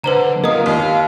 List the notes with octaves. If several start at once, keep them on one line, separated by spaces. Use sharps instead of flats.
D3 B4 C5 A#5
B3 F4 A#4 D#5 D#6
D#2 F5